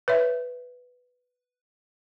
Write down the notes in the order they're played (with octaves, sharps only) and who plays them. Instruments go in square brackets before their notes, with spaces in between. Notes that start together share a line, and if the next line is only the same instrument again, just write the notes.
[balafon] B4 C#5 E5